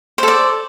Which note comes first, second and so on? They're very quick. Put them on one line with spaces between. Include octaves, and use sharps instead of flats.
C5 A4 D5